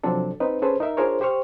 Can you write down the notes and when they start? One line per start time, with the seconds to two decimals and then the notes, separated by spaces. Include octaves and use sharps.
0.04 C3 F3 F#3 C4 D4 A4
0.40 C4 D#4 B4
0.62 C#4 G#4 A4 B4 C5
0.80 D#4 A#4 E5
0.97 D4 F4 G#4 A#4 C5 C#5
1.21 G4 C5 G5 C#6 F6